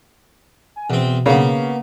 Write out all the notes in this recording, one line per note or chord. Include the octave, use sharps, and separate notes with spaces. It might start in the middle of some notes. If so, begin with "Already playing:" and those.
G#5
E2 B2 C4
C#3 A#3 B3